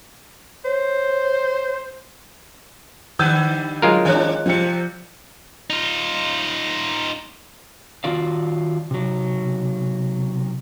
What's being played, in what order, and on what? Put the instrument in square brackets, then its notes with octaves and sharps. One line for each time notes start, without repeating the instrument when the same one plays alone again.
[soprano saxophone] C5 [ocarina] C#5
[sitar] D3 G3 B4 [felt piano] E6 G6
[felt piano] F#3 [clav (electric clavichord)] G#3 F4 A#4
[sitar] D#3 C4 D4 [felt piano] C#5 D#5 F#6
[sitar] C3 G3 C4 [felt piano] F3 C#7
[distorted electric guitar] D#4 F4
[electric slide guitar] D#3 F4 F#4 D5 F5
C3 F#3